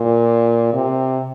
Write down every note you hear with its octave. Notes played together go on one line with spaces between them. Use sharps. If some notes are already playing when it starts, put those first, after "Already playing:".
Already playing: A#2
C3